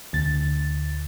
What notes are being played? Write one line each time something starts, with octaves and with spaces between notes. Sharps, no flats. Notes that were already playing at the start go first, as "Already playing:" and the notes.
D2 A6